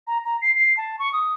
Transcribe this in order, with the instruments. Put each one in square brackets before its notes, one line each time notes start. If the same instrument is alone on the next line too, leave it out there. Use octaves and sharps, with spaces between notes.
[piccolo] A#5
A#5
C7
C7
A5
C#6
D#6